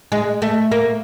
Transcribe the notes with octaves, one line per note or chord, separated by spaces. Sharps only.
G#3
A3
A#3